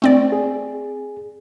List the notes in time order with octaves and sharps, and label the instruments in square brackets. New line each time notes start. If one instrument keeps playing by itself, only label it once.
[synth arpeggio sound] A3 C4 D5
[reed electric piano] G#4